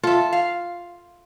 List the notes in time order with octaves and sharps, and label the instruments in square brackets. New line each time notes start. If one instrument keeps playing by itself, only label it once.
[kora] F4 [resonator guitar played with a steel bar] A4 E5
[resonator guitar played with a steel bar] F5